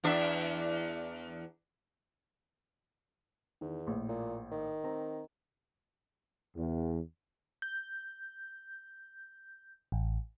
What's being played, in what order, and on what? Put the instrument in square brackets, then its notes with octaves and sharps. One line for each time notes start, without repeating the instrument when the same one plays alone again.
[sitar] E2 D4 E5
[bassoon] E2 [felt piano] D#3
[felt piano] A#1 A2
[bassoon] A#2
D#3
[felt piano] C4 A#5
[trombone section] E2
[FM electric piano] G6
A1